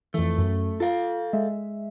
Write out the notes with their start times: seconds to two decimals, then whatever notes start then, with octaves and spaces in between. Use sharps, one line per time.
0.14 F2 E3 A3
0.38 F#2
0.80 F4 A4 F5
1.33 G#3 E5